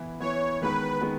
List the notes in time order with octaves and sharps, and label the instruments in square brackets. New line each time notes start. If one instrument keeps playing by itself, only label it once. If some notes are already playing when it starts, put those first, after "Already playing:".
Already playing: [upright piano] E3 B3 E4
[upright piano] E3 B3 E4 [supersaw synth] C#5
[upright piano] D#3 G#3 B3 [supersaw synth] B4
[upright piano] D#3 G#3 B3